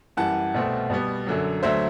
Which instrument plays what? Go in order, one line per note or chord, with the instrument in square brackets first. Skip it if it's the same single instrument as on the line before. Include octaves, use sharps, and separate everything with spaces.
[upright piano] F#2 E3 G3 F#5 A5
C2 B2 A3 C4
B2 G3 B3
F#2 D3 F#3
D2 D3 F#3 A3 C5 E5